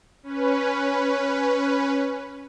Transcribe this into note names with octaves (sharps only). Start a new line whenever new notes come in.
C#4 B4